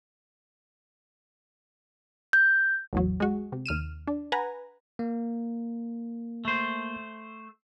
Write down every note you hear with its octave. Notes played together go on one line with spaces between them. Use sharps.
G6
A1 E2 F#3
G#3 F#4
C3
D#2 F6 D#7 E7
D4
B4 F#5 G#5 A#5
A#3
A3 C5